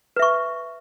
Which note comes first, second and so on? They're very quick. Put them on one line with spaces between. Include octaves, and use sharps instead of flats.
B4 E5 C#6